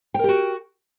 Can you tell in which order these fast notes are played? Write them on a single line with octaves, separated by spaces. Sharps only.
G5 A#4 G4 F#4